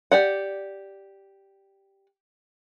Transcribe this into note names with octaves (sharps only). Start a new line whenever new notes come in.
G4 D5 F#5